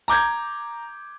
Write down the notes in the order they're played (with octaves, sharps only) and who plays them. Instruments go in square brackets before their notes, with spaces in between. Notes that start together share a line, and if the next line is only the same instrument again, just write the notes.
[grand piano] A#5 D6 G6 G#6